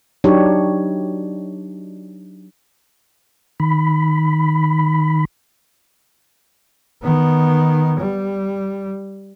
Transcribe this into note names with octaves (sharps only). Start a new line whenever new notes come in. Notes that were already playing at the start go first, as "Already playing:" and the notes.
F#3 D4 D#4 G4 C#5
D#3 B5
D#3 B3
G3